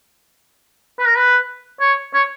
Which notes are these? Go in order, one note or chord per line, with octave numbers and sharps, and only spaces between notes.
B4
A#4
B4
C#5
C#5